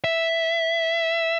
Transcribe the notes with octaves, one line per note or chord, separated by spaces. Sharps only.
E5